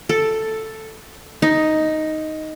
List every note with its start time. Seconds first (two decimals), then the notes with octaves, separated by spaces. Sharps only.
0.09 A4
1.42 D#4